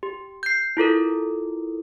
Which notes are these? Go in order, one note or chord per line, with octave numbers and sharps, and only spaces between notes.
G4
G6 C7
E4 F4 A4 A#4